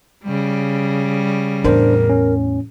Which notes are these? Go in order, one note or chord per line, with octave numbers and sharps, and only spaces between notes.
C#3 G3
E2 A2 D4 A#4 C5
C#4